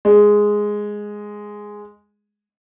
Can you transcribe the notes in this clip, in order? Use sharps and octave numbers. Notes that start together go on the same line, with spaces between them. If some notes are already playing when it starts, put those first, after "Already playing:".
G#3